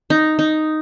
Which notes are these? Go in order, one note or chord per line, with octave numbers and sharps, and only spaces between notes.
D#4
D#4